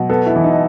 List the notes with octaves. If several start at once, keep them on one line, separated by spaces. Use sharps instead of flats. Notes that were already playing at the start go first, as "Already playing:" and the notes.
Already playing: B2 F#3
B3 A4
E4
E3
D#4